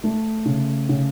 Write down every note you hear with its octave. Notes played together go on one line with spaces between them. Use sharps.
A3
C#3
C#3